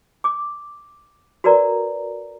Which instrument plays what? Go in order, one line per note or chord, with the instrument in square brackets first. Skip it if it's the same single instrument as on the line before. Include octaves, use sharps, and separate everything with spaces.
[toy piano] D6
F#4 A#4 B4 D5 A#5